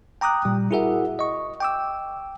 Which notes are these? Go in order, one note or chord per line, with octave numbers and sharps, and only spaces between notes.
G5 A#5 D6 D#6 F#6
A#2 G3
E4 F#4 G#4 A#4 E5 F#5
D#5 C#6
G5 D6 E6